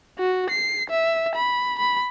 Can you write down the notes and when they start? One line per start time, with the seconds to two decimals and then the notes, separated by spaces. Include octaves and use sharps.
0.19 F#4
0.50 C7
0.91 E5
1.36 B5
1.79 B5